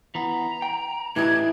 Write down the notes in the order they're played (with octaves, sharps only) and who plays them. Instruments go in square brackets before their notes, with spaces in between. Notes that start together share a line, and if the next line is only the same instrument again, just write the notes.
[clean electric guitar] E3 B3 [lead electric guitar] A#5
[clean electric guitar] G5
[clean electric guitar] A2 G4 D#5 [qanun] E3 E4 [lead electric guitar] D4 [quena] G#6